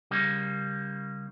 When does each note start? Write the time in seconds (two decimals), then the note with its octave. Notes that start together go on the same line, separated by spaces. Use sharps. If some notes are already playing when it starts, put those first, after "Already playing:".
0.11 C#3 G3 A#3